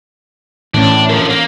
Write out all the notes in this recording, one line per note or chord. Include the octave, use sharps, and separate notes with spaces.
A2 E3 C#4 D4
D3 F3 A#4
A#3